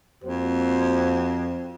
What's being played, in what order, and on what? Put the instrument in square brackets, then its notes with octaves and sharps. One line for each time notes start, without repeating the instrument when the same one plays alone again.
[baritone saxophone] F2 [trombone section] A#3 F#4 C5